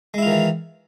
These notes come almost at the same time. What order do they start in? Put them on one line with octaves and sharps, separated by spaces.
G#3 E4 F4 D#3 E3